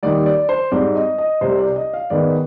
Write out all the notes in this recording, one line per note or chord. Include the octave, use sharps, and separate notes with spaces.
D#2 D#3 G3 D5
D5
C5
G#2 G3 C4 D5
D#5
D#5
C2 C3 G3 C5
D5
D#5
F5
G#2 D#3 G#3 B3 D5